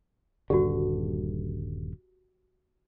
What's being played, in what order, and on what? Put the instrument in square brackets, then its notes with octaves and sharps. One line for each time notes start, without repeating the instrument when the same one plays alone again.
[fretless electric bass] D#1 G2 D3 [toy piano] F#4 G4